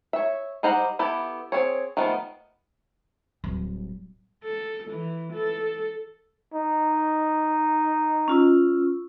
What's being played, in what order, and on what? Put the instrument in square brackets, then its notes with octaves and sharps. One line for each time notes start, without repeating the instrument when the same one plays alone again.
[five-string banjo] C#5 E5
G3 D#4 C5 F#5 A#5
B3 E4 G4 A4
C4 G#4 C#5
D#3 F3 A3 B3
[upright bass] D1 G3
[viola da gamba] A4
E3
A4
[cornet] D#4
[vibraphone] C#4 F4 E6